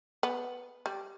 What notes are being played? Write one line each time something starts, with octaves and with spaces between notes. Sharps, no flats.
B3
G3